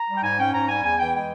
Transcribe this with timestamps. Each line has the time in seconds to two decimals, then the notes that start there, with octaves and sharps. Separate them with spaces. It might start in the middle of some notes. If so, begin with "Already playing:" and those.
Already playing: A#5
0.09 G3
0.17 G5
0.23 G#2 G#5
0.39 C#4 G5
0.54 G#2 A#5
0.69 G3 G#5
0.83 E2 G#5
0.98 E3 G5
1.13 G#3 G5